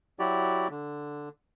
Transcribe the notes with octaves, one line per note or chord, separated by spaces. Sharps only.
F#3 E4 F#4 G4 D5
D3